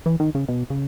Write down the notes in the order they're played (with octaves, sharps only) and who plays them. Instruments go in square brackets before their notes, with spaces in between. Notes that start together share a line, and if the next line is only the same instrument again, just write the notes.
[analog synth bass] E3
D#3
C#3
B2
C#3